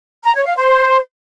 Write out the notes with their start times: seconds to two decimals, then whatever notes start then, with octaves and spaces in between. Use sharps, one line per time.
0.24 A#5
0.35 C#5
0.46 F5
0.57 C5